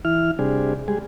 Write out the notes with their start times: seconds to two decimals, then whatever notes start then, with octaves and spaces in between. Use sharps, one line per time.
0.05 E3 E4 F6
0.39 C3 G3 D4 G#4
0.88 G3 G#3 G#4